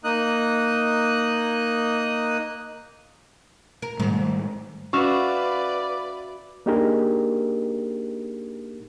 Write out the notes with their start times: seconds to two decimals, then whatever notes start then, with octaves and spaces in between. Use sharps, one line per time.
0.04 A#3 D#4 D#5 D#6 F#6
3.82 A#4
4.00 G#2 D#3 G3 A3
4.93 C#4 F#4 B4 D5 E5 F5
6.66 A#3 D4 D#4 G4 G#4 A#4